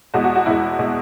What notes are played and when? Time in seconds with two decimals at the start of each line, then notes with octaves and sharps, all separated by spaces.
0.14 E2 B2 G#3 F#4
0.24 F#4
0.36 F#4
0.46 E2 B2 G#3 E4
0.79 B2 G#3